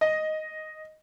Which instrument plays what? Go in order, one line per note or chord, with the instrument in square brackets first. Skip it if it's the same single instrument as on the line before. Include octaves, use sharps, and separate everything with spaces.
[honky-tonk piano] D#5